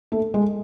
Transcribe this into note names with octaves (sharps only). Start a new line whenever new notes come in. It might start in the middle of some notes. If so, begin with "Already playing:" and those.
A3
G#3